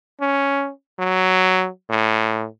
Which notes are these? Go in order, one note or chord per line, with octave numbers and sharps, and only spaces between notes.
C#4
F#3
A2